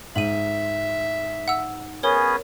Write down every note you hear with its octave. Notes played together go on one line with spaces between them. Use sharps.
G#2 E5 D#7 F#7
F#5 E6
B3 C#4 G#4 A#4 C#5